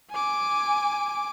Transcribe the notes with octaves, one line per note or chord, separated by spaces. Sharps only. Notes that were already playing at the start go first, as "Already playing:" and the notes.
G#5 D6